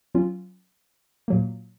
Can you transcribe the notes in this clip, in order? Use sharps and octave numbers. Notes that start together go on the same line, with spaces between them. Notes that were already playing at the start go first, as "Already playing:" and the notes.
F#3 C#4 F4
A#2 F#3 A#3